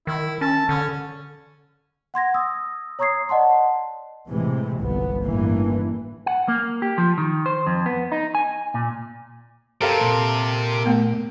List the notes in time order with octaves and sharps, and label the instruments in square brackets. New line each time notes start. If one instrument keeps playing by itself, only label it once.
[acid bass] D#3 [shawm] E4
[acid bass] C#4 [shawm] A5
[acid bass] D3 [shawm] C#4
[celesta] F#5 C6 G#6 A#6
D#6 E6 A#6
C#5 A#5 C#6 D#6 G#6 C7
D5 D#5 F#5 A5 C6
[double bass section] A2 C3 E3 G#3
G1 C2 B3
A1 G2 E3 A#3
[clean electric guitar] F#5
A#3
G4
F3
D#3
C5
F2
B3
D#4
G#5
A#2
[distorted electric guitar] C3 [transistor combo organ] G4 [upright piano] A4 A#4 F5
[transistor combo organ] A#2
[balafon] A3 B3